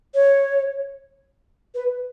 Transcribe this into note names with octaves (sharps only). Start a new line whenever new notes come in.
C#5
B4